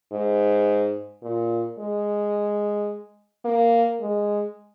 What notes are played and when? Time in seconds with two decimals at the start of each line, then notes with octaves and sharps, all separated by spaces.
0.12 G#2
1.23 A#2
1.79 G#3
3.45 A#3
4.00 G#3